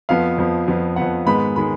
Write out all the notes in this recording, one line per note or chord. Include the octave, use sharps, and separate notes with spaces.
F2 F3 B3 F5
F2 F3 B3
F2 F3 B3
F2 F3 B3 F#5
G#2 D#3 G#3 B3 B5
D#3 G#3 B3 B5